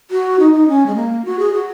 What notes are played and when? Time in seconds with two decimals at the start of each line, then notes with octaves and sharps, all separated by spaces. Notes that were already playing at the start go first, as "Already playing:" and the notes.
0.11 F#4
0.39 D#4
0.53 D#4
0.68 C#4
0.86 G#3
0.96 A#3
1.25 F#4
1.39 G#4
1.54 F#4